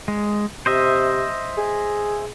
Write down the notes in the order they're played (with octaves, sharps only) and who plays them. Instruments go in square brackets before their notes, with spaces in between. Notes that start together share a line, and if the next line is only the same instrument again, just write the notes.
[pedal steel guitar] G#3
[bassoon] C3 [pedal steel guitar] C5 D#5 E5
[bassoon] G#4